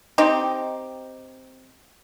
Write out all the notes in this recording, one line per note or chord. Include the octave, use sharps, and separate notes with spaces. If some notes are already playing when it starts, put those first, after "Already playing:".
C4 D#4 G4